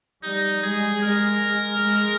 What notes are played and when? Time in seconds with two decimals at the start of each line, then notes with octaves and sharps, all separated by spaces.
0.23 G3 D#4
0.63 G#3 G#4
1.03 G#3 A#4
1.82 G#3